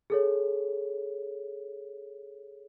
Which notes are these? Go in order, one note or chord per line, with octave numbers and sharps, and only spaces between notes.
G#4 A4 C#5